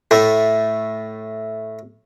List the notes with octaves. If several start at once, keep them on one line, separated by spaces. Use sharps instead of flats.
A2 A3